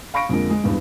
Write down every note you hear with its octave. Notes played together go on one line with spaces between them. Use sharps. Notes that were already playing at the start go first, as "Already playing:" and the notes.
F5 B5 C#6 A#6 D7
F2 D3 F3 G#3 A#3
G#3
G#1 E2 G2